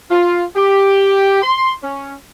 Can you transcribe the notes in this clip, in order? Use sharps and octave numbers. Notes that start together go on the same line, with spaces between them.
F4
G4
C6
C#4